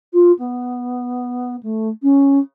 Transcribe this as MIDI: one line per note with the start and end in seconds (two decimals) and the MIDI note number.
0.13 0.31 65
0.38 1.56 59
1.62 1.88 57
2.02 2.38 61